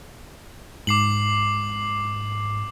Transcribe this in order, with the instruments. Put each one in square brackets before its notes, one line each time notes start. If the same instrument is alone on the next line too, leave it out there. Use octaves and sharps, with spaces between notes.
[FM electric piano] G#2 [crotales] D6 C7 F#7